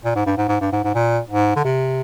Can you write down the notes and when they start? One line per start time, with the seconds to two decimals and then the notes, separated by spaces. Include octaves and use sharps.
0.05 A#2
0.15 G#2
0.26 G2
0.37 G#2
0.48 G#2
0.61 G2
0.72 G#2
0.84 G#2
0.95 A#2
1.30 G#2
1.56 D3
1.64 C3